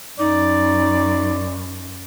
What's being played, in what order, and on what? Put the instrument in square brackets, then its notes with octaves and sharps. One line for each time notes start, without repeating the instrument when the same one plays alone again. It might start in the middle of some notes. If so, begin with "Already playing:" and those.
[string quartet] F#2 [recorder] D#4 [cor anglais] D5